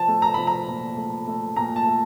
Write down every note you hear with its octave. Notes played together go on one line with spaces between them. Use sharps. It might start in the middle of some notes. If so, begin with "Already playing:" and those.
Already playing: F3 A5
A3
A#5
F3 B5
A#5
A#2
A3
A3
A#2 A#5
A5
A3